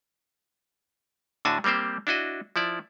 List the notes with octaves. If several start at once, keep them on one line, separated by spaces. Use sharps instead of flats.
A2 D3 D4 F#4 G#5 A5
G3 A#3 C4 G4 C5
D4 E4 F#4 D#5
F3 E4 D5